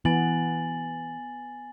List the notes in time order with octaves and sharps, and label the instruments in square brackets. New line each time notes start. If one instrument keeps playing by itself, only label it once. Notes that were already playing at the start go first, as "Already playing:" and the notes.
[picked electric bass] E3 [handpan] B3 [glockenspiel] G#5 A6 F#7